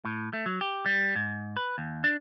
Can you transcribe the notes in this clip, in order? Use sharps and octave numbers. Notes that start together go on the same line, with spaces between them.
A2
A3
F#3
G4
G3
G#2
B4
D#2
D4